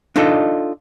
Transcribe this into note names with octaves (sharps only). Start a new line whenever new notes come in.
D4 D#4 F4 A4 D#5